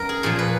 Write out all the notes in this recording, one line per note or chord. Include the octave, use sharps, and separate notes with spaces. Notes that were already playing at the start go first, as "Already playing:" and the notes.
Already playing: F#2 A#4
G#4
A#2 F3 G#4
B4